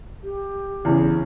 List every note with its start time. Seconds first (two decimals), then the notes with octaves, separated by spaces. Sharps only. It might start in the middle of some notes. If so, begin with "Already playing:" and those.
0.23 G4
0.85 E2 C#3